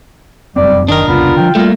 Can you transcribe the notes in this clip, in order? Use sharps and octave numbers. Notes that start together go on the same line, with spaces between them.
F1 F#2 G3 C4 D5
F#1 D#3 D4 A#4 D#5
F1 C2 C#3 B3 F4
D3 F3 G5
G3 A3 A#3 F4